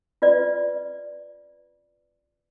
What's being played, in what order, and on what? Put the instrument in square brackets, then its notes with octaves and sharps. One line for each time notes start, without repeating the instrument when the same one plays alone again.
[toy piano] F4 B4 D5